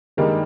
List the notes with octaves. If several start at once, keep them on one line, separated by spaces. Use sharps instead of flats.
G2 D#3 G3 G#3 A#3 D#4